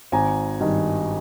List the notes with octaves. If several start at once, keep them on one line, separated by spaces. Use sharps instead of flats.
G#1 G#5 A#5
G2 D#3